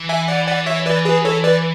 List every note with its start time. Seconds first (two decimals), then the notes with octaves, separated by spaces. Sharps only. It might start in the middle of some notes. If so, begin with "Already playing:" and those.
Already playing: E3
0.09 E5 G#5
0.28 D5 F#5
0.47 D5 F#5
0.66 C#5 E5
0.86 B4 D5
1.05 G#4 B4
1.25 A4 C#5
1.44 B4 D5